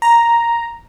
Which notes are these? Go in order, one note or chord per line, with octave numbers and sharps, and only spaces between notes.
A#5